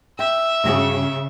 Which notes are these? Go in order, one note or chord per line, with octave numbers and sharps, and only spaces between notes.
E5 G5
G2 C#3 F#4 G#4